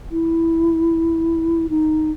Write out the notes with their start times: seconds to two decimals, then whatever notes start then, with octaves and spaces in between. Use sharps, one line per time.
0.11 E4
1.70 D#4